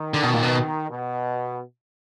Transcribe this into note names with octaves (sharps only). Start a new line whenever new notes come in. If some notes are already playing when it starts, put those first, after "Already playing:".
Already playing: D#3
D3
B2
A#2
B2
B2